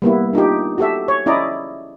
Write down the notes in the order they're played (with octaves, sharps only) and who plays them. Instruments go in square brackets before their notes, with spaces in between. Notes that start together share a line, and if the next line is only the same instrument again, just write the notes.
[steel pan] G3 A#3 B3 E4
D4 D#4 F4 G4
F#4 G4 A4 E5
C#5
C#4 E4 D5 D#5 A#5